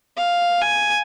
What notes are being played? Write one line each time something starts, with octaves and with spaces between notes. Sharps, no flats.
F5
G#5